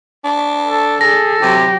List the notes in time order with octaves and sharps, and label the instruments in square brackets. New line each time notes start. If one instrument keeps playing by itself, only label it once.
[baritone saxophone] D4
[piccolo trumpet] A4
[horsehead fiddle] G#4 [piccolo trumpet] A4 [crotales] A#6
[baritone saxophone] C3 [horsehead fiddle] F#3 G4